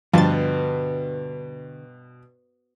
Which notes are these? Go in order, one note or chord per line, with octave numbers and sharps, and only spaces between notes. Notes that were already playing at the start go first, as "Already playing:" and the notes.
G2 B2 D3 F3 C5 A6